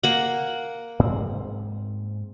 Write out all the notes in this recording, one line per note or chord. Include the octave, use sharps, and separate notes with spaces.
A#3 F#5
G#2 C4